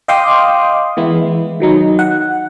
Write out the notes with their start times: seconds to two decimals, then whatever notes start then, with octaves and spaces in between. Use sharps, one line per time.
0.08 D#5 F5 G5 C6 D6 D#6
0.97 E3 G#3 B3 E4
1.60 D#3 F#3 D#4
1.99 F#5